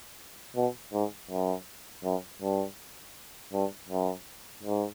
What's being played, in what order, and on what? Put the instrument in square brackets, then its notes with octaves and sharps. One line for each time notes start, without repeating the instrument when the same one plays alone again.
[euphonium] B2
G#2
F#2
F#2
G2
G2
F#2
G#2